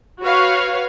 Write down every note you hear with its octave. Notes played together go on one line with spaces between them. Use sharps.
F#4 B4 C#5 F5